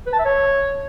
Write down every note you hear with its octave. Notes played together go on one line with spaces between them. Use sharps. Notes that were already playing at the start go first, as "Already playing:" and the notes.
B4
A5
E5
C#5